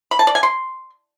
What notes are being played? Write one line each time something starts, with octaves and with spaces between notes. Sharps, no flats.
B5
A5
D5
G#5
C6